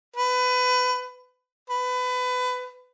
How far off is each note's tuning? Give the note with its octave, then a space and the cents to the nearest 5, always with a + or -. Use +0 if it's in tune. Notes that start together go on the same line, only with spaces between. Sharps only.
B4 +25
B4 +25